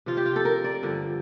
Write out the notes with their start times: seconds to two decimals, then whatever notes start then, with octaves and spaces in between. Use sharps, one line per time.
0.06 C3 F3 F4
0.17 G4
0.26 F4
0.36 A4
0.45 A#4
0.64 D5
0.83 G2 D3 F3